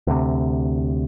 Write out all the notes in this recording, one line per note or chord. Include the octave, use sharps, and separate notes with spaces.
D2 C3